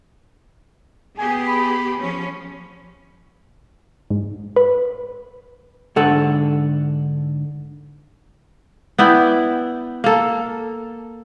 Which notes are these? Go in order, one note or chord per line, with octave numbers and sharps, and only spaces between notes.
B3 G4 G#4 G#5
B5
F3 C#4
G#2
B4
G#2 D3 A4 F#5
B3 E4 D5 G5
A#3 A4